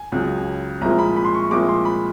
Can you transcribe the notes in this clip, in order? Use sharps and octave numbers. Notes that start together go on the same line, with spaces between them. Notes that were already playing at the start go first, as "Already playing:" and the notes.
Already playing: G#5
C#2 C#3 F#3
C2 A#2 F3 G#3 A#5
B5
B5
C6
C#6
C2 A#2 F3 G#3 D6
C6
B5